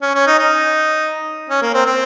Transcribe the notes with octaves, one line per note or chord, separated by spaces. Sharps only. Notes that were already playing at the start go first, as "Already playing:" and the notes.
C#4
C#4
D#4
D#4
C#4
A#3
C4
C4